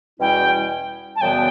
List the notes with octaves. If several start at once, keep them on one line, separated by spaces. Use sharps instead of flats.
E2 B2 G3 C#4 E4 G5
A5
F#2 C#3 E3 G3 B3 G5